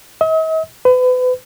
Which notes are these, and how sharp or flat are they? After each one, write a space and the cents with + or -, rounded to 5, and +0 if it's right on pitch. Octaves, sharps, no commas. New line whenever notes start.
D#5 +45
B4 +35